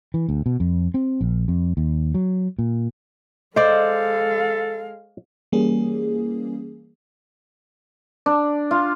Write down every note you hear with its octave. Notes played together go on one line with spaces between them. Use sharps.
E3
D2
B2
F2
C4
A#1
F2
D#2
F#3
A#2
G#3 A4 C5 D5 D#5 F5
E3 G3 A#3 C#4 G#4
D4
F4